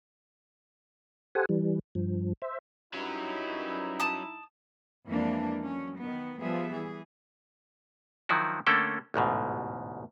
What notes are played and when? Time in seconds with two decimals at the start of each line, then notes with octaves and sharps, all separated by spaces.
1.35 G4 A4 C5 F#5 G#5
1.49 E3 G3
1.95 G2 F3
2.42 C5 E5
2.94 G2 F#3 C#4 D#4 E4
4.00 A5 D#6
5.08 F2 E3 G#3 A#3 D4
5.64 F#3 C#4
5.99 D#3 B3
6.40 F3 G3 B3 G#4 E5
6.70 E3 G#4
8.29 D#3 F3 F#3 E4 F#4
8.67 D3 A3 A#3 C#4 A4 G5
9.14 A1 D2 G#2 B2